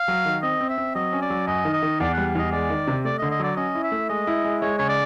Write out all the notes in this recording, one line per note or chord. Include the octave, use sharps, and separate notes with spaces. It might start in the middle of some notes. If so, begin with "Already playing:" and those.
Already playing: F5
F#3
D#3
C4 D#5
C4
E5
C4
F#3 D#5
C#4
D5
F#3
F#2 D#5
D#3
D#5
D#3
E2 D5
G3 F#5
E2 D#5
G#3 D5
D#3
C3
A3 D5
D#5
D3
D#5
F#3 D5
C#4 D#5
E4
E5
A3
G#3 D#5
E4
G#3
G#3 C#5
C#3 C#5
D5